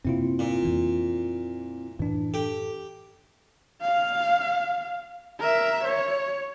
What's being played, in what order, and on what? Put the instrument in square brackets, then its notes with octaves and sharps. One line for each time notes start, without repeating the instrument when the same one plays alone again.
[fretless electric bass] F#2 C3 A#3 [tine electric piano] C4 E4 F4
[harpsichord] A#2
[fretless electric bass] F2 E3 A#3
[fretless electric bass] F#2 A2 [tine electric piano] E3 D4
[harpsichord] G4 [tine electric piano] A4
[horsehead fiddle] F5
A#4 E5
C#5